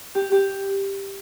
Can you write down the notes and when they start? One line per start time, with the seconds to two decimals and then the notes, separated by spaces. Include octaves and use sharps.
0.15 G4
0.32 G4